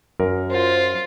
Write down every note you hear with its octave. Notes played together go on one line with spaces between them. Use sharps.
F#2 A#4
F4 C5